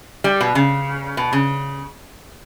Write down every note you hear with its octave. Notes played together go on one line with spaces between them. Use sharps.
G3
B2
C#3
B2
C#3